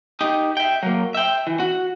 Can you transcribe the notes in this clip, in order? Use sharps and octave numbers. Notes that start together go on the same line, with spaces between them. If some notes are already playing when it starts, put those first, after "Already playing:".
D#4 G4
E5 G5
F#3 A#3
E5 G5
E3
F#4